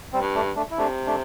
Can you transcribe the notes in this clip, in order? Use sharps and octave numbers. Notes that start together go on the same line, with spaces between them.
G3 C4
G2
A3 D4
A3 D4
E4
C3 A3 D4
A3 D4